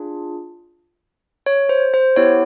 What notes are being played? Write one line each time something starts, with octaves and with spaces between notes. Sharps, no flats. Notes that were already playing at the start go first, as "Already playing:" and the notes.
Already playing: D4 F4 G#4
C#5
C5
C5
B3 E4 G4 C#5